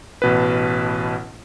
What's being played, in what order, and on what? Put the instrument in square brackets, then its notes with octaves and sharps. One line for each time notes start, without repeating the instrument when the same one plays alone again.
[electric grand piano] A1 B2 B4